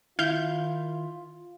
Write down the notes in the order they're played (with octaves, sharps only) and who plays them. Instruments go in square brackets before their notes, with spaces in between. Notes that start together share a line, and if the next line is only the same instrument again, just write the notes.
[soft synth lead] D#3 [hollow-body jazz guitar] E4 [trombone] F4 [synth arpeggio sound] F5 G6